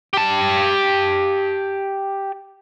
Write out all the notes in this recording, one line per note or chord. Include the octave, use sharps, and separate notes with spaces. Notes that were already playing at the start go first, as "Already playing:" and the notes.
G4 A5